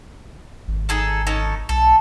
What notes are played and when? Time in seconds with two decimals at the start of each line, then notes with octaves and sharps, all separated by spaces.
0.68 G#1
0.89 D#4 G#4 A4
1.27 C#4 D#4 A4
1.69 B1 A4